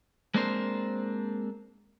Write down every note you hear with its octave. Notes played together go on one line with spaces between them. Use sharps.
G#3 A#3 C4 D4 A#4 C5